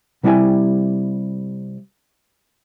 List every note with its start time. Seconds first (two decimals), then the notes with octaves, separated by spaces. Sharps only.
0.23 C3 G3 E4 C#5 G5 G#5